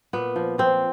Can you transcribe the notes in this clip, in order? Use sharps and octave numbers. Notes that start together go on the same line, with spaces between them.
A#2 B3
F3
F3 C4